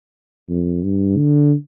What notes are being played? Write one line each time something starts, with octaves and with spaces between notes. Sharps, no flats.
F2
G2
D3